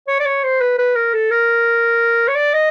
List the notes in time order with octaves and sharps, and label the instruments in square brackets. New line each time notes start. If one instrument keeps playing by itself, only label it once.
[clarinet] C#5
D5
C#5
C5
B4
B4
A#4
A4
A#4
C#5
D5
D#5